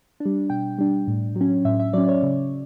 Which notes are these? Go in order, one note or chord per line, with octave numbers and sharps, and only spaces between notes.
D4
G3
B2 G5
G3 D4
A2
F#3
C#4
A2 E5
E5
F#3 C#4 D5
C#5
C#3